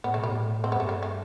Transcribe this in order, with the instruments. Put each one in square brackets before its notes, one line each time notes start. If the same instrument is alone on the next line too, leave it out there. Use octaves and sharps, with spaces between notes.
[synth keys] A2 [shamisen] B3
[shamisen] A3
[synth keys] B2
[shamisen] G3
[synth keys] A2
[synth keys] A2 [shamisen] C4
[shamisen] B3
[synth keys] G2 [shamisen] A3
[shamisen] G3
A3